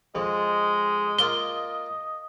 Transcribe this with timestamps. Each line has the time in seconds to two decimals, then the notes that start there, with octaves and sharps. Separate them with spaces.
0.15 F2 G#3 D#5
1.19 A#3 F4 D5 G7